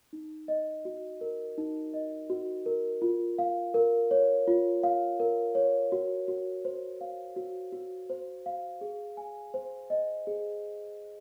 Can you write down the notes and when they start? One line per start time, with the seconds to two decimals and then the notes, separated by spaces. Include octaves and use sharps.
0.13 D#4
0.48 D#5
0.85 F#4
1.21 A#4
1.58 D#4
1.94 D#5
2.30 F#4
2.66 A#4
3.02 F4
3.38 F5
3.74 A#4
4.11 C#5
4.48 F4
4.83 F5
5.20 A#4
5.55 C#5
5.92 F#4
6.28 F#4
6.65 C5
7.01 F5
7.36 F#4
7.72 F#4
8.09 C5
8.46 F5
8.81 G#4
9.17 G#5
9.54 C5
9.90 D#5
10.27 G#4